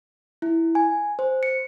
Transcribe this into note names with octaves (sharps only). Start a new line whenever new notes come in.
E4
G#5
C5
C#7